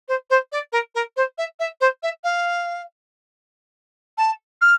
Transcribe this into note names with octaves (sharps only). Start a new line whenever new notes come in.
C5
C5
D5
A#4
A#4
C5
E5
E5
C5
E5
F5
A5
F6